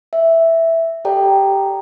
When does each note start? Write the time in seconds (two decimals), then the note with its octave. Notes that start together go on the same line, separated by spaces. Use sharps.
0.13 E5
1.05 G4 A4 D5 G5 A#5